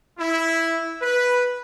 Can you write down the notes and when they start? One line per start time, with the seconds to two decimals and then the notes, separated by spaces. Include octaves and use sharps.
0.18 E4
1.01 B4